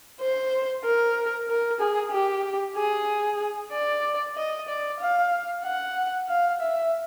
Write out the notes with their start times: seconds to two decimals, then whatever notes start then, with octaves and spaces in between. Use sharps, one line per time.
0.21 C5
0.84 A#4
1.49 A#4
1.81 G#4
2.12 G4
2.77 G#4
3.72 D5
4.37 D#5
4.68 D5
5.00 F5
5.64 F#5
6.29 F5
6.60 E5